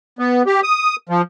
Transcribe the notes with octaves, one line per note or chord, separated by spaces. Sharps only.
B3
G4
D#6
F3